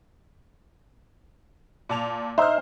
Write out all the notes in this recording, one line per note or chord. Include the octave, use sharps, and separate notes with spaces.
A#2 A5 F7
D#4 C5 E5 F6